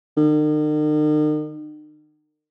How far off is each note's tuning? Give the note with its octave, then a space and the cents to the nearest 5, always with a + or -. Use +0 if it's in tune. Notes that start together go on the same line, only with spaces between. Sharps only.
D#3 -45